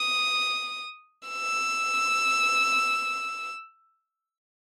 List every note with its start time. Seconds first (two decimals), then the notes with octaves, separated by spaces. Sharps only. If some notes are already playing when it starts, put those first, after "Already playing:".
Already playing: D#6
1.29 E6